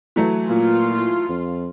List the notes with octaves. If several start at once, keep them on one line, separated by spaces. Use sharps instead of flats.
E3 F#3 A3
A#2 F4
F2